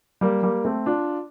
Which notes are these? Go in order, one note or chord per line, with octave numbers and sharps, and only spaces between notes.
G3 A#3
G3 A#3
A3 C4
D4 F4